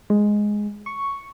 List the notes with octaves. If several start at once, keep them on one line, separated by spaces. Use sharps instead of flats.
G#3
C#6